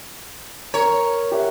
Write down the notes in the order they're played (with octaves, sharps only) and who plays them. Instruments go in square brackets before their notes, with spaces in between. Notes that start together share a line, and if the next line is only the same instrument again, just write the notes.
[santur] A#4 [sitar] C#5
[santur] G4 E5 F#5